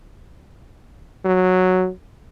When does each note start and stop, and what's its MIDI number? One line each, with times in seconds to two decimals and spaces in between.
1.25 1.89 54